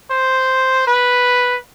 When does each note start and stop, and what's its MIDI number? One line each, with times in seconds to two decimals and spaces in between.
0.11 0.86 72
0.87 1.57 71